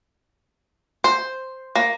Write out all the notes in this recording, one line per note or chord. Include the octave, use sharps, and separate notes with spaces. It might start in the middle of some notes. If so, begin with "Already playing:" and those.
C5
A#3